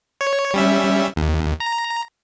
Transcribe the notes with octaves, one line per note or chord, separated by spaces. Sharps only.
C#5
G3 C#4 E5
D#2
A#5